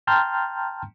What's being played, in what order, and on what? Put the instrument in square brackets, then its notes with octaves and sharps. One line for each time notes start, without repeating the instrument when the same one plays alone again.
[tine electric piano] G5 A5 A#5 C6 F6 G6